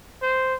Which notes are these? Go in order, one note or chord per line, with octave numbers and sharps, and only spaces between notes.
C5